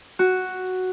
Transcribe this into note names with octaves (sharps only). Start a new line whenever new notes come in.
F#4